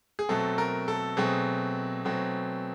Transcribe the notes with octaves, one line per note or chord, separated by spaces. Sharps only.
G#4
B2 F#3 A3 C4 A4
A#4
A4
B2 F#3 A3 C4 G#4
B2 F#3 A3 C4